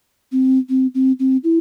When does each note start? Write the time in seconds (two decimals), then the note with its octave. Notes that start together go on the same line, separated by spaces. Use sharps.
0.32 C4
0.69 C4
0.95 C4
1.19 C4
1.44 E4